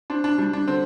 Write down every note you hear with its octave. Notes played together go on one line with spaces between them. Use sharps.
C4 D4
D4
G3 D4
D4
D3 C4